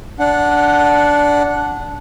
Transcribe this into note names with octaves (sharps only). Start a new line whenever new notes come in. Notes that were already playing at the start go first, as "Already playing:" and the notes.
D4 F#5